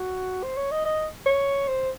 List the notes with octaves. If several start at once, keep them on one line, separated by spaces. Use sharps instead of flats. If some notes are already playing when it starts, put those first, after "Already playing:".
Already playing: F#4
C5
C#5
D#5
D#5
C#5
C5